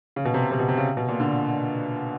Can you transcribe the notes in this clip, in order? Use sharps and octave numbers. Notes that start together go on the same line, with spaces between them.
C#3
B2
C3
C3
B2
C3
C#3
B2
A#2
D3